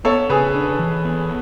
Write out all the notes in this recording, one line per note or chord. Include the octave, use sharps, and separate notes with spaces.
B3 A4 C#5
C#3 G#4 B4
D4
E3
B3